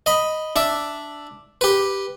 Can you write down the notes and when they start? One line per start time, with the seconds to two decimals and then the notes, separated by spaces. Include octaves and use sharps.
0.06 D#5 B5
0.56 D4 D5 E5
1.61 G4 B4